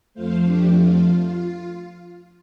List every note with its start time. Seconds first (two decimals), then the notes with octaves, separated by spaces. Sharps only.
0.14 F2 F3 A3 C5 F5
0.45 D4 G4
0.76 F4